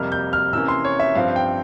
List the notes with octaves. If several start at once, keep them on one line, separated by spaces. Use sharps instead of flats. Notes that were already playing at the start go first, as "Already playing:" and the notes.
Already playing: F2 C3 G3 A#3 F6
G6
F6
C3 E3 A#3 C#4 E6
C6
C#5
E5
G2 F3 C4 F5
G5